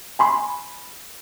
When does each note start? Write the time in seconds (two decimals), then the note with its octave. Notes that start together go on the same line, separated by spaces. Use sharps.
0.19 G#5 B5 C6